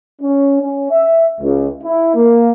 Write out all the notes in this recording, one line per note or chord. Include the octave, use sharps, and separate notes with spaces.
C#4
C#4
E5
C#2
E4
A#3